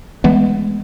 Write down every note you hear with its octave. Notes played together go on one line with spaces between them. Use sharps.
E3 G#3 A3 B3